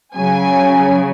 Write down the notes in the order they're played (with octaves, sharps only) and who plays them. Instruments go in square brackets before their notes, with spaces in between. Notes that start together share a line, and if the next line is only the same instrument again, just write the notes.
[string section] C#3 F#3 G#5